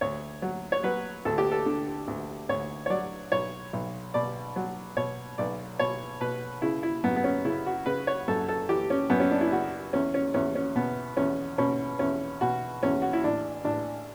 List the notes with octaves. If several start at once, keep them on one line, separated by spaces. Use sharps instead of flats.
D2 C#5
F#3
C#5
F#3 B4
D2 A4
G4
A4
D3
D2
D2 C#5
C#5
F#3 D5
B1 C#5
B1
B2 D5
F#3
B2 C#5
B1 D5
B2 C#5
B2 B4
C#3 E4
E4
F#2 B3
B3
C#4
C#3 E4
F#4
C#3 B4
C#5
F#2 A4
A4
E3 G4
C#4
F#2 B3
C#4
D4
E4
C#3 F#4
E2 C#4
C#4
E2 C#4
C#4
B2 B3
E2 C#4
B2 C#4
E2 C#4
B2 F#4
E2 C#4
F#4
E4
A1 D4
A1 D4